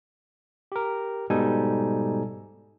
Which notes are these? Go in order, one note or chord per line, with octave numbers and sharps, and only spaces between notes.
G4 A#4
G#2 B2 G3 D#4 A4 G#5